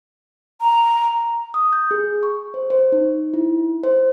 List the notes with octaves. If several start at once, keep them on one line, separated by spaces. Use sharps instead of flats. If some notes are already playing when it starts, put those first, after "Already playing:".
A#5
D#6
G6
G#4
C#6
C5
C5
D#4
E4
C5